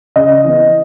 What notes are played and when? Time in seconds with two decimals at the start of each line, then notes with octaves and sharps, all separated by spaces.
0.16 C#3 D#5
0.44 E3 B3